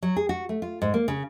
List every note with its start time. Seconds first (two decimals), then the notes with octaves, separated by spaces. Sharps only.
0.03 F#3
0.17 G#4
0.29 F#4
0.49 A3
0.62 F4
0.82 G#2
0.94 A#3
1.08 C#3